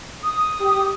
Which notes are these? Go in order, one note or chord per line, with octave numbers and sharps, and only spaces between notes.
D#6
G4